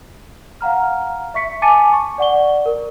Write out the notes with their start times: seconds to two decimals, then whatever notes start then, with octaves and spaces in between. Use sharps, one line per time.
0.61 F5 F#5 A#5 F6
1.34 E5 C#6 B6 C#7
1.62 G#5 A5 D6 A6 C#7 D#7
1.93 C#6
2.18 D5 F#5 C#6 G7
2.66 A#4